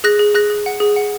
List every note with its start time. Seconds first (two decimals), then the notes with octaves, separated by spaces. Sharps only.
0.04 G#4 F#6 A#6
0.19 G#4
0.34 G#4 F#6 A#6
0.50 G#4
0.66 F#5
0.80 G#4
0.96 F#5